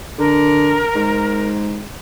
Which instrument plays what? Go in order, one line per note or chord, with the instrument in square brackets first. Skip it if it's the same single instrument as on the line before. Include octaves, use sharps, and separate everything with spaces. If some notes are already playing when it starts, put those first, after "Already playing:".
[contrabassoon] D3 [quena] A#4
[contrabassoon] G#2